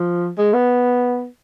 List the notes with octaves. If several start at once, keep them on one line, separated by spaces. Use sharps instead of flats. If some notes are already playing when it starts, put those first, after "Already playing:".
Already playing: F3
G#3
B3